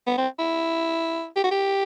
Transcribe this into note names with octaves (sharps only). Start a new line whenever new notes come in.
B3
C4
E4
G4
F#4
G4